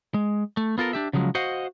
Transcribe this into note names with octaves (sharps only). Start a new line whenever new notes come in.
G#3
A3
B3 F4 A4 A#4
D4 G4 E5
C#3 F3 F#3 G#3
F#4 C5 D#5 F5 F#5